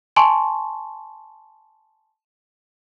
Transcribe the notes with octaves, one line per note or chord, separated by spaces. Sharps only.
G#5 A5 C6 C#6